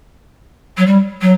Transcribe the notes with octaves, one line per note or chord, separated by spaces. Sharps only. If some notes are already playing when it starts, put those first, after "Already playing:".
F#3
G3
F#3